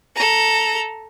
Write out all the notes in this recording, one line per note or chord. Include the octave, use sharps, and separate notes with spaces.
A4 A#5